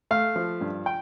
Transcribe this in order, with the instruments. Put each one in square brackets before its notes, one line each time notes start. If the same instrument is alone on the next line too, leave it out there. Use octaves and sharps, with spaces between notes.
[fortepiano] A3 F5
F3
G2
G5